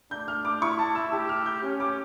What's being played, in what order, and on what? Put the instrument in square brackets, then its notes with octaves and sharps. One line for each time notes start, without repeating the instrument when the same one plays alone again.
[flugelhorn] D4 [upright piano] G6
[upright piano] F6
D6
[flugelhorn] E4 [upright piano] C#6
[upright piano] A5
E6
[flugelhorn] G4 [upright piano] E6
[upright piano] F6
G6
[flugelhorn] C#4
[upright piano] D6